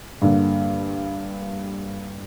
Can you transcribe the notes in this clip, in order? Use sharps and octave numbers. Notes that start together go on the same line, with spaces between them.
G2 D3 A#3